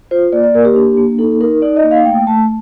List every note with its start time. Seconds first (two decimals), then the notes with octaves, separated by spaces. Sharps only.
0.11 F4 C5
0.33 A#3 D5
0.44 D5
0.54 A#3 A#4
0.65 G4
0.76 D4
0.97 A#3
1.19 D#4 A4
1.41 D#4 A#4
1.62 D#4 D5
1.76 D#5
1.83 A#3
1.91 F5
2.05 A3 G5
2.27 A3 A5